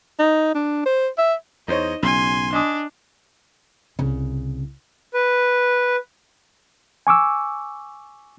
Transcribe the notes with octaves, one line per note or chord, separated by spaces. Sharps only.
D#4
D4
C5
E5
E2 D#4 C5 C#5 D#5
B1 C#3 G#5 C6
D4 D#5 G#5 D#6
C2 C#3
B4
G#5 C#6 D6 E6